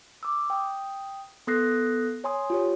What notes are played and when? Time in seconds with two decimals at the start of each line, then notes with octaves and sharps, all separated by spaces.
0.23 D6 E6
0.50 G5 D#6
1.47 B3 A4 D#6 F#6 A#6 C7
2.24 C#5 G#5 C6 D#6
2.50 F4 G4 C#5